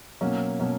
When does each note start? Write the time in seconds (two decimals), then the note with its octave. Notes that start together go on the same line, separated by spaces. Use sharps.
0.21 B2 F#3 A#3 C#4
0.60 B2 F#3 A#3 C#4